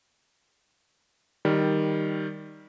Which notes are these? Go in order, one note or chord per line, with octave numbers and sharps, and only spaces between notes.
D#3 G3